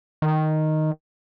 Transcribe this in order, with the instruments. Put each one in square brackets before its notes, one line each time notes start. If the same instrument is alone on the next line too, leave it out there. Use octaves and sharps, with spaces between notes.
[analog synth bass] D#3